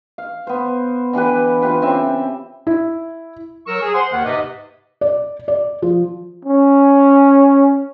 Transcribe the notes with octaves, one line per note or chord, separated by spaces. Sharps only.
F5
B3 C5
D3 E3 G4 B4
F4 G4 B4 C5
C#3 C4 E5
E4
F#3 A#4 C#6 E6
G#4
C5 F#5 C6
D#2 D#3 F#5
G#2 C3 B4 D#5
D5
D5
F3
C#4